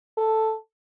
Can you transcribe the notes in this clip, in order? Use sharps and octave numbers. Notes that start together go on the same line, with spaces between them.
A4